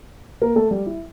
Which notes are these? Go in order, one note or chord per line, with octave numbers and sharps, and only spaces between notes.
A#3 A#4
A3 A4
G3 G4
E4